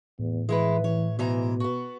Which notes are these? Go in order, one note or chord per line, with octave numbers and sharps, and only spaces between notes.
E2 A2
E3 G#3 E4 B4
E3 C#5
G#2 B2 E3 A#5
B3 F#4